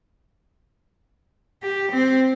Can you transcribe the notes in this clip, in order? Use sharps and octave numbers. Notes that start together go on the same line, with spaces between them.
G4
C4